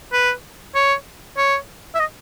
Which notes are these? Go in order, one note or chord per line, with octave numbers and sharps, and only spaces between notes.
B4
C#5
C#5
E5
D#5